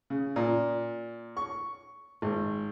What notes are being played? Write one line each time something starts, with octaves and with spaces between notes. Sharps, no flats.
C#3
A#2
C#6
G#1